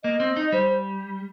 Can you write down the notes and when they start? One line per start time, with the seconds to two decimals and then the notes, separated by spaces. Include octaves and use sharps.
0.04 A#3 D#5
0.20 C4
0.37 D#4
0.52 G3 C5